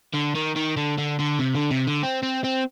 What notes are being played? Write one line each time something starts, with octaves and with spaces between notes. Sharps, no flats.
D3
D#3
D#3
D3
D3
D3
C3
D3
C3
D3
C4
C4
C4